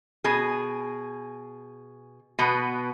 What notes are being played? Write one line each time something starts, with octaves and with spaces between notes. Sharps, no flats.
B2 G#4
B2 B3